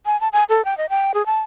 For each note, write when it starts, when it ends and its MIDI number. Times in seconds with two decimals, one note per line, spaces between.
0.06 0.19 80
0.21 0.28 81
0.33 0.44 80
0.49 0.64 69
0.65 0.77 79
0.77 0.86 75
0.90 1.12 79
1.14 1.25 68
1.26 1.41 81